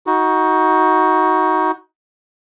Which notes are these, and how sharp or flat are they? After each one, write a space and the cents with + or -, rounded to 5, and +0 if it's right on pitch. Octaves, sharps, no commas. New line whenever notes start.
D#4 +25 F#4 +0